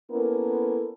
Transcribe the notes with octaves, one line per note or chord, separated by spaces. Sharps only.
A#3 B3 C#4 E4 A4 A#4